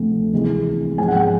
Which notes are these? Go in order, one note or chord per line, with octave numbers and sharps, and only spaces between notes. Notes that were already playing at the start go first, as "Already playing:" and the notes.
Already playing: D2 C3 F3 A3
C2 C3 E3 G#3
G#1 G#2 F3 G#3 G#5
F#5
G5